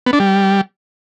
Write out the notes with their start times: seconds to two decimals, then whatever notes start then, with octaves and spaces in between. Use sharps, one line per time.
0.06 B3
0.13 D4
0.20 G3